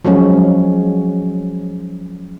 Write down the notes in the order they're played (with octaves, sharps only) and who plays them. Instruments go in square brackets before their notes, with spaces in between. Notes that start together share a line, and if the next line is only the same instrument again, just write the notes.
[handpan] F3 F#3 G#3 C#4